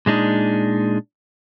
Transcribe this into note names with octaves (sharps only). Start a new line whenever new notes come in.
A#2 G#3 D4 D#4